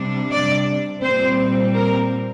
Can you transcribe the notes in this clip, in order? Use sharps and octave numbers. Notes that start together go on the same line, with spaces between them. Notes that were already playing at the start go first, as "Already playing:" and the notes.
Already playing: C3 G3 D4
D5
A#2 G3 C4 C5
A#4